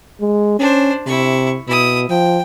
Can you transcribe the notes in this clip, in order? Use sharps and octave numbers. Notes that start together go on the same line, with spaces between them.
G#3
C#4 D4 C5
C3 E4 C#6
B2 E4 D#6
F3 G5